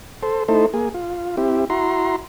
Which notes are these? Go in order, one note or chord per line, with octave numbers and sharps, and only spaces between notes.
A4 C5
A3 D#4 E4 A4 C5
A#3 G#4
F4
C4 E4 G4
E4 F#4 A#5 C6